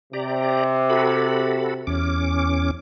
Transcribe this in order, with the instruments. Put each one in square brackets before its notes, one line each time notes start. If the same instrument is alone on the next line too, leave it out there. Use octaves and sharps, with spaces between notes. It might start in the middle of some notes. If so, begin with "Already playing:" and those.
[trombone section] C3 [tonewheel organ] G4 D5 A#5
[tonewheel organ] F#4 A4 B5
E2 C#4 D6